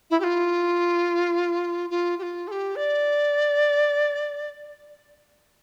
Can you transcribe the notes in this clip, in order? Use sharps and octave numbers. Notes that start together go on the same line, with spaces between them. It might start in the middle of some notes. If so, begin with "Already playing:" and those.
E4
G4
F4
F4
G4
F4
A4
G4
D5